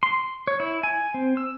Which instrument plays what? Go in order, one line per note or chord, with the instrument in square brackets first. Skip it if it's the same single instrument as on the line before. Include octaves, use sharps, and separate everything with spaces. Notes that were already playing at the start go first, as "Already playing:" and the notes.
[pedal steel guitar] C6
C#5
E4
G#5
C4
E6